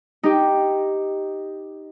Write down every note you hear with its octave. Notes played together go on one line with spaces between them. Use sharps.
D#4 G4